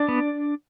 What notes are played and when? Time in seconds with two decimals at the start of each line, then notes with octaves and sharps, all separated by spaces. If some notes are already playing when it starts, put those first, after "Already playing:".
Already playing: D4 D5
0.09 B3